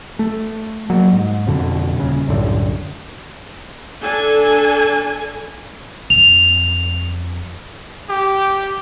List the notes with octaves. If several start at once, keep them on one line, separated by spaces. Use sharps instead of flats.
A3
F#3 A#3
G#2
F2 B2 D3
D#1 C#3
C2 F#2 A2 D3
D4 A4 G#5
F2 F7
G4